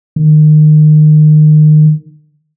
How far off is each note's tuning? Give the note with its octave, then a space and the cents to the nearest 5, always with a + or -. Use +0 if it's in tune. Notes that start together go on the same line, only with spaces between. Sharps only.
D#3 -30